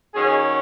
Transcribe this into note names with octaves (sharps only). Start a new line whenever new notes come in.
D#3 F#3 C#4 G#4